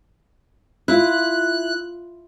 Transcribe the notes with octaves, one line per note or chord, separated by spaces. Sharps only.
E4 F4 F#6